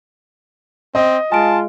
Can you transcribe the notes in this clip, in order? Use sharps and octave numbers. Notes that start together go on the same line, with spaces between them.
C4 D#5
G#3 F4 G#5 A5 D7